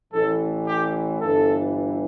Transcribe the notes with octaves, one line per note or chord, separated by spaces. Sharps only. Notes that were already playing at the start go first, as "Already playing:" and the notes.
A1 A2 E3 A4
G4
G1 G2 E3 A4